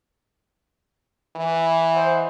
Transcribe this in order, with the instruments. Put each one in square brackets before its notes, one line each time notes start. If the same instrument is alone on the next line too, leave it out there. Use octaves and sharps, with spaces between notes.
[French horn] E3
[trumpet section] C5 D#5 F#5